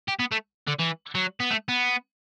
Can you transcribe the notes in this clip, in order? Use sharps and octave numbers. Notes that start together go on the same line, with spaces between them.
G4
B3
A3
D3
E3
F#3
B3
A3
B3